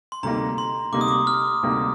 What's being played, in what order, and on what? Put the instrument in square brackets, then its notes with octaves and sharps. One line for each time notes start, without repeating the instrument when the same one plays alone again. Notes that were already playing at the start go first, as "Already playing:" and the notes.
[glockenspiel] C6
[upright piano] D2 C3 G3 A#3 D#4 [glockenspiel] A#5
[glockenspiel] C6
[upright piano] D2 C3 G3 A#3 D#4 [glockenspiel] D6
[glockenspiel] D#6
D6
F6
[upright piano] D2 C3 G3 A#3 D#4